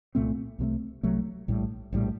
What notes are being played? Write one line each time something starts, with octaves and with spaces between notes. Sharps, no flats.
C2 A#2 A3 C4
C2 C3 F#3 A3
C2 C3 F#3 A3
A#1 A2 G3
A#1 A2 G3